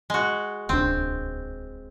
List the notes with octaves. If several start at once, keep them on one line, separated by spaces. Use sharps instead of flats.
G#3 F#4
D1 C2 C4 D4